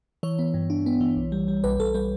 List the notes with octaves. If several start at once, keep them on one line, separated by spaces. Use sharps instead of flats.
E3 C#5
B3
G2
D4
B3
E3
B1
G3
G3
B1 B4
B1 A4
G3 B4